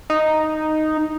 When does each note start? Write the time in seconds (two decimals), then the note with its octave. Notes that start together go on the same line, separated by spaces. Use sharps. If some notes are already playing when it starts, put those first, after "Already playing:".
0.10 D#4